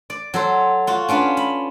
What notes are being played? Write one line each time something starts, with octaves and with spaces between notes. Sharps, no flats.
D5
F#3 A4 C5
F4 F#4
C#4 D4 F4 B4
B5